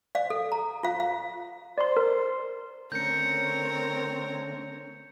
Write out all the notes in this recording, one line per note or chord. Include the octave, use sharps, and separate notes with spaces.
D5 F5
A4
A#5
F4 F5
F5
C5 D5 C6
A#4
D3 A3 C4 C#4 A#4 C#5 G6 C#7